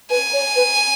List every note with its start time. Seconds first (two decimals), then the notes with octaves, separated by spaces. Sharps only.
0.10 B4 G#5
0.33 C#5
0.56 B4